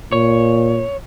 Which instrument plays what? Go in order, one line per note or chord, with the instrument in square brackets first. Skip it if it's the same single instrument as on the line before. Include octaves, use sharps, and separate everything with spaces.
[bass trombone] A#2 [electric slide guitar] C#5